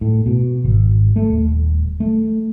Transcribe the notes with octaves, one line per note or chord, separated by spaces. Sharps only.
A2
B2
G#1
A3
D#1
A3